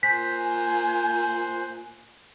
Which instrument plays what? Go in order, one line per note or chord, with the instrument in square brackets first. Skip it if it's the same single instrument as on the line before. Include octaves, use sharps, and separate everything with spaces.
[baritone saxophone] A#2 [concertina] C5 F#6 [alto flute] G#5 [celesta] B6